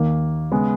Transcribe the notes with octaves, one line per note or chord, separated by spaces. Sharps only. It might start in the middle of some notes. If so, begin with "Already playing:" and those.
Already playing: D#2 D#3 A#3
C#3 G#3 B3